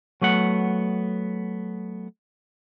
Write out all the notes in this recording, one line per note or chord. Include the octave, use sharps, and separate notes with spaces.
F#3 A3 B3 F#5